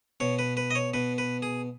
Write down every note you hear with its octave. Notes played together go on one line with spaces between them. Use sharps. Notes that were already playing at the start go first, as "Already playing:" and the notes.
B2 C#5
B4
B4
D#5
C#5
B2 B4
B4
G#4